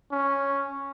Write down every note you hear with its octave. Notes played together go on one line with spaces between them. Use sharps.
C#4